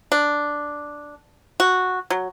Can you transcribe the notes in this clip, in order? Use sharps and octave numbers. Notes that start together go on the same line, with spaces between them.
D4
F#4
F#3